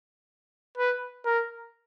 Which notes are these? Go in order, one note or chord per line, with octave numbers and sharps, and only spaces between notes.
B4
A#4